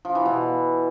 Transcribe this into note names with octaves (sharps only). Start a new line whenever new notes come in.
F3
E3
B2